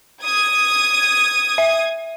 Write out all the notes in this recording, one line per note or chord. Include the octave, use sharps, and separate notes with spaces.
D#6 G#6
E5